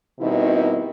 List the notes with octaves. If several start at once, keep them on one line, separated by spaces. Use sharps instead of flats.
B2 D#3 G3 C4 D#4 E4